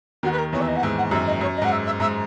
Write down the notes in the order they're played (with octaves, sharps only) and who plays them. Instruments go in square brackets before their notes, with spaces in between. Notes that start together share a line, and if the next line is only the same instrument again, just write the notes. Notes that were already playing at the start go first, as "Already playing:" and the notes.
[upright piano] D#2 D#3 [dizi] F#4
[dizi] B4
A#4
[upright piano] E2 E3 [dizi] C#5
[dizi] E5
D#5
F#5
[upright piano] G#2 [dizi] E5
[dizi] F#5
[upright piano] F#2 [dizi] E5
[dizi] D#5
[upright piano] F#2 [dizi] C#5
[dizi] D#5
[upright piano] G#2 [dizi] F#5
[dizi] E5
E5
[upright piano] G#2 [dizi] E5